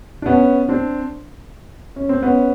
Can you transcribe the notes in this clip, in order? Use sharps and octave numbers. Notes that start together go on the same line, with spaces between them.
D4
B3 C#4
C4 D4
C#4
C4
B3 C#4